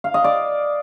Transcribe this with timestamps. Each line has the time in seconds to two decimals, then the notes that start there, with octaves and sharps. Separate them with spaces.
0.04 F5
0.14 D#5
0.24 D5